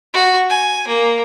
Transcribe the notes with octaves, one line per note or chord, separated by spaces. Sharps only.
F#4
G#5
A#3